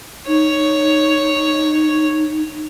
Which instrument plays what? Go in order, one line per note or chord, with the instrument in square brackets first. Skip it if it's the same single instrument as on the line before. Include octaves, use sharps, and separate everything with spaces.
[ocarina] D#4 [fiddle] C#5